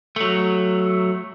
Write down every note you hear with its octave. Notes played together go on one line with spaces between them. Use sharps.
F#3 A3